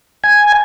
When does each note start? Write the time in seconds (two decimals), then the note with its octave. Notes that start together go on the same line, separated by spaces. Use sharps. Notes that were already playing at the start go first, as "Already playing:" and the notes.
0.24 G#5